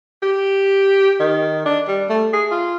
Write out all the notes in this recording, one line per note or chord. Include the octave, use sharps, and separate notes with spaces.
G4
D#3
D4
G3
A3
G#4
F4